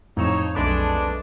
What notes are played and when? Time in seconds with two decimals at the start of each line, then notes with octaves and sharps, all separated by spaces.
0.17 F2 A2 F3 D#4 C#5 E6 E7
0.55 B1 G#3 A3 D4 B4 D6